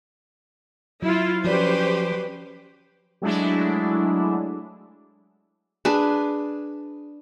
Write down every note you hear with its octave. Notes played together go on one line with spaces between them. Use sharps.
F#3 E4 F4
F3 C#4 F#4 G4 B4 C5 D5
F#3 G#3 A3 D4 E4
D4 G#4 B4